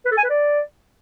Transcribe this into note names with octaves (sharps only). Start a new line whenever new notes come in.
B4
A4
G#5
B4
D5